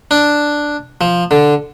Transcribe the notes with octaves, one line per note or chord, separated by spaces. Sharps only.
D4
F3
D3